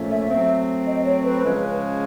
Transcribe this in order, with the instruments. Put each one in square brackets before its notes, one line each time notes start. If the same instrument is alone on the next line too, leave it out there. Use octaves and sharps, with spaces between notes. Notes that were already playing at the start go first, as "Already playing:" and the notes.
Already playing: [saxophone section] A#2 F3 A3 C#4
[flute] E5
[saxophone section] F#3 A3 C4 [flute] E5
[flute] D#5
C#5
B4
[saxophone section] C#3 F3 G#3 C#4